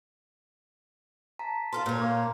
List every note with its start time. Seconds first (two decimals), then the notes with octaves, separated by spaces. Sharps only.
1.39 A5 A#5 B6
1.73 F4 A4 A5 C6 F6
1.86 A#2 C#5
2.00 A#3